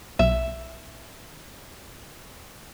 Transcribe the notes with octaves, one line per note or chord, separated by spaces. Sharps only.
B1 E5